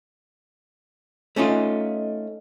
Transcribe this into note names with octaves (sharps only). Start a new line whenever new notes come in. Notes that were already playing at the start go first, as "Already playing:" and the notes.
A3 C#4 D#4 F4